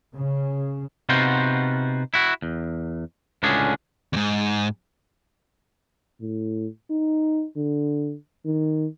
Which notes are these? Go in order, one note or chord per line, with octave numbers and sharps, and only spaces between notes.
C#3
C3 B3 D#4 F4 F#4 C5
E4 F#4
E2
C#2 A2 D3 C#4 D4 G#4
E2 G#2
A2
D#4
D3
D#3